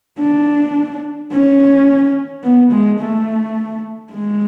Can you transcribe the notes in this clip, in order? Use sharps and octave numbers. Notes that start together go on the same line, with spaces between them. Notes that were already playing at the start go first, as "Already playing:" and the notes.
D4
C#4
B3
G#3
A3
G#3